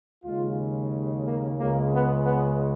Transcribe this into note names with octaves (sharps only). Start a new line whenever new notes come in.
D#2 C#3 G#3 F4
A#3
C#2 C#3 G#3 A#3
B3
B3